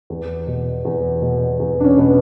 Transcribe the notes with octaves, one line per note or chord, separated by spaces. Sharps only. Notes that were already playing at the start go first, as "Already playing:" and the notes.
E2
B2
E2
B2
E2
D4
C#4
B2 B3